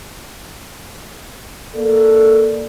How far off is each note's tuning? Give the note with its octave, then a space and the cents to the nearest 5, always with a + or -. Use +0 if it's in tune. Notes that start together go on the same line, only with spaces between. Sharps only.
A#3 +0 A4 +0 D5 +0